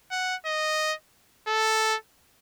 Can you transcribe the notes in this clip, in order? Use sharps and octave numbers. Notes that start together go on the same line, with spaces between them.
F#5
D#5
A4